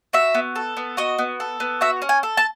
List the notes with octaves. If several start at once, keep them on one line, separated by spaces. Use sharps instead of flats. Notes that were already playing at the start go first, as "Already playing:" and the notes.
F#4 E5
B3
A4
B3
F#4 D#5
B3
A4
B3
F#4 E5
C#4
G#5
A4
A5